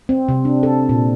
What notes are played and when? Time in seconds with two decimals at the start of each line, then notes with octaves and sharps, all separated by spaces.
0.09 C4
0.29 C3
0.45 D4
0.63 A4
0.89 A#2